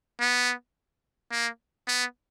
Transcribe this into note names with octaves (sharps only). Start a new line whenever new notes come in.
B3
A#3
B3